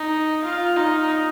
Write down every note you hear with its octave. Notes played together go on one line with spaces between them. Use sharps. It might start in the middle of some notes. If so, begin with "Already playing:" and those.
Already playing: D#4
F4
D#4